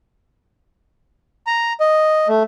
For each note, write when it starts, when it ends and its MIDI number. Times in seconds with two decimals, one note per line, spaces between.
1.47 1.73 82
1.80 2.28 75
2.28 2.43 57